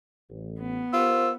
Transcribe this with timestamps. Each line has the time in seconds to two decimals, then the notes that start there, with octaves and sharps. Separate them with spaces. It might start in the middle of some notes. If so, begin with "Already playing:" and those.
0.30 A1
0.61 B3
0.93 F4 G4 A#4 C5 E6